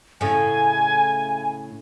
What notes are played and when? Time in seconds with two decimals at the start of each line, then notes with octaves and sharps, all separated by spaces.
0.21 A2 C#3 G#5